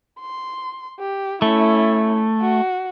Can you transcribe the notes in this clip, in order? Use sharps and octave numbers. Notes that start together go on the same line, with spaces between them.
C6
G4
A3 C#4 E4
F#4